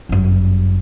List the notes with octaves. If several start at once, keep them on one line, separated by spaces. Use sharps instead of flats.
G1 F#2